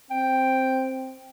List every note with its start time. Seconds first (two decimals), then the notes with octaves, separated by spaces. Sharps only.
0.11 C4 G5